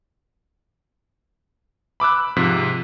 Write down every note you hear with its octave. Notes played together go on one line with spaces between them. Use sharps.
B5 D6 E6 F#6
G#2 C3 F3 F#6 B6